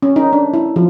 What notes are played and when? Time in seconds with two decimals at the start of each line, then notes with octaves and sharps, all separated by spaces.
0.02 C#4
0.16 D#4
0.33 D4
0.53 E4
0.76 F3